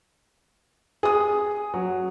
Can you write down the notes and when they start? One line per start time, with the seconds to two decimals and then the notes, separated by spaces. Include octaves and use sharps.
1.03 G#4 D#6
1.74 F#3